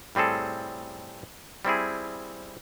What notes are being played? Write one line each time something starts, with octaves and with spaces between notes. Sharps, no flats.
A2 G3 C4 G#4 A4
G3 C4 E4 G#4